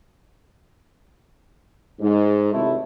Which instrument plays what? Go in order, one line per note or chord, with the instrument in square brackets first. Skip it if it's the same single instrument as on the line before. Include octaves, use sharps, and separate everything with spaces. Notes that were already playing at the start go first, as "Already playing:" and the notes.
[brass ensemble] G#2
G#1 C3 A3 E4